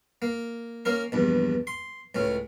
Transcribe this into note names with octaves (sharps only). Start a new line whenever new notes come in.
A#3
A#3 C#4 A#4
A#1 E2 G2
C6
C#2 A2 C#4